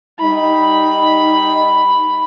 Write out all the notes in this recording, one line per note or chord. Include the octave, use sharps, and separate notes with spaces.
G3 D#4 B5